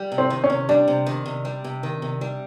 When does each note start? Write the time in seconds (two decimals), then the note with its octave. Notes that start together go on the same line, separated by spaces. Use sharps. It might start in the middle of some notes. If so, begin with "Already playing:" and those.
Already playing: G3
0.12 C3
0.18 C4
0.30 D#3
0.44 C#4
0.50 C3
0.69 G3 D4
0.88 C3
1.06 D#3
1.26 C3
1.45 G3
1.64 C3
1.83 D#3
2.02 C3
2.21 G3